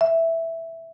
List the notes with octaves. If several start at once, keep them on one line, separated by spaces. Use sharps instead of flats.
E5